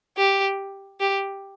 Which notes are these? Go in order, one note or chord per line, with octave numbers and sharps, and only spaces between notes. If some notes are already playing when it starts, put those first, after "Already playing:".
G4
G4